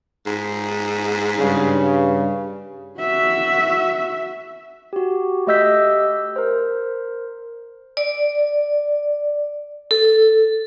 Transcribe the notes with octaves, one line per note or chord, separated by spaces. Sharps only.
G#2
G2 C#3
F#4 E5
F#4 G4
A3 G4 D#5 E6 G6 B6
A#4 C5
D5
A4